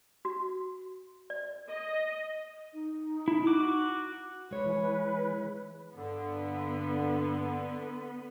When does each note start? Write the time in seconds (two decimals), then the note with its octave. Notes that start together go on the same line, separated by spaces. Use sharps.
0.25 F#4
1.30 D5
1.69 D#5
2.74 D#4
3.28 E4
3.47 F#4 D6
4.51 G#3 B4 C#5
4.66 E3
5.95 G2 D3 B3